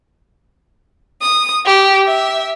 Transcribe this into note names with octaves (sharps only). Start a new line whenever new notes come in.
D#6
G4
E5